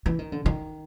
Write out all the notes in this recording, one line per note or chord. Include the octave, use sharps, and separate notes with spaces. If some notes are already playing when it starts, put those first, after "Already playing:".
E3
D#3
D3
D#3